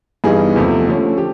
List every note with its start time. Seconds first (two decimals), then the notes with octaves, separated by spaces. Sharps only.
0.24 G2 E3 G3 B3 D#4 G#4
0.56 E2 C3 F3 A3
0.87 D3 F3 A3 C#4
1.17 G4